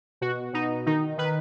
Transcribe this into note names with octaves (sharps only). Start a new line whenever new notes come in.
B2 F#4
B2 D#4
D#3 D#4
D#3 B4